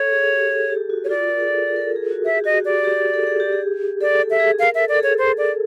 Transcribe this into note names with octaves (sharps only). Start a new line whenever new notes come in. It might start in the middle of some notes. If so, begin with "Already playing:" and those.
Already playing: A4 C#5
G#4
G4
A4
G#4
G4
F#4
C#5
F4 D5
A#4
G#4
A4
G#4
A#4
A4
G#4
F#4
G#4 E5
G4
F#4 D#5
G4
D5
G4
A4
G#4
G4
G#4
A4 D5
A4
E5
G#4
A#4 F5
A4 E5
D5
A4
G#4 C#5
C5
D5